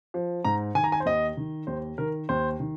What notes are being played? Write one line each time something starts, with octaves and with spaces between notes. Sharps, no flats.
F3
G#2 A#5
D#3 G#5
A#5
G#5
C5
D#2 D#5
D#3
D#2 C5
D#3 A#4
D#2 C5
D#3